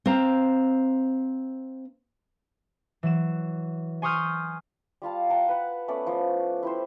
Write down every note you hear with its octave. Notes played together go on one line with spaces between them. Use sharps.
C4 C5 F5 A#5
E3 F#3 E7
G#5 C6 C#6 D#6 F6 G6
G3 F4 F5 A5
F#5 G5 A5 A#5
B4 F#5
A3 B3 C#4 D5
F3
E4 G4 C5